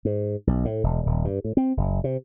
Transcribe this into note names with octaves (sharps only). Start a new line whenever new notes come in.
G#2
B1
A2
E1
D#1
G2
A2
C4
F#1
C3